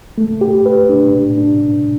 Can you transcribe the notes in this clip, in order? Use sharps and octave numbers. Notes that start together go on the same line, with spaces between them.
A3
G4
B4
D4
A2
D4